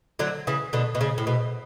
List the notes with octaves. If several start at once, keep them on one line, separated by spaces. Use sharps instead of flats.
D3 F#3
C#3 E3
B2 D3
B2
C#3
A2
B2